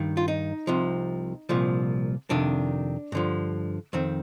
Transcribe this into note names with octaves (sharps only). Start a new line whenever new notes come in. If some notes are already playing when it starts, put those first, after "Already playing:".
Already playing: G2 D#3
F4
D#4
C2 C3 F3
C2 A#2 F3
F2 C3 D#3 D4
G2 D3 F3
F2 D#3 C4